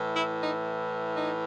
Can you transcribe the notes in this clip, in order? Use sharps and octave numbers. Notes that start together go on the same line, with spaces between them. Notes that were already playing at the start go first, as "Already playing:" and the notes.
Already playing: A2 E3
E4
D#4
D#4